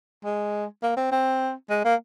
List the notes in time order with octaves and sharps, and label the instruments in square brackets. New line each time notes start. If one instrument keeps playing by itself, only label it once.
[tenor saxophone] G#3
A#3
C4
C4
G#3
A#3